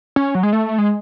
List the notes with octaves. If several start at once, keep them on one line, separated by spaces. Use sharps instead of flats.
C#4
F#3
G#3
A3
G#3